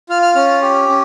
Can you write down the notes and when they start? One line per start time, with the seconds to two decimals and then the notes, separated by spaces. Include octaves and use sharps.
0.09 F4 F6
0.22 F6
0.35 C#4 F6
0.62 G4
0.88 C#4